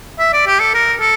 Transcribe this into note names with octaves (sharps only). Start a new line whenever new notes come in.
E5
D5
G4
A4
A#4
A4